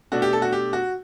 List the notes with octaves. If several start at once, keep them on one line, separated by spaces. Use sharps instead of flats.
B2 A3 D4 F#4
G4
A4
F#4
G4
F#4